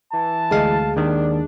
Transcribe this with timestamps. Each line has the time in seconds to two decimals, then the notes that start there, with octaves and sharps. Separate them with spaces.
0.13 E3 A5
0.51 D2 G#3 F5
0.96 D#2 D#3 D4